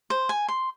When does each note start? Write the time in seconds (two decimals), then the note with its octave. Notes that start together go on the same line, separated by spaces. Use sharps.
0.10 C5
0.29 G#5
0.48 C6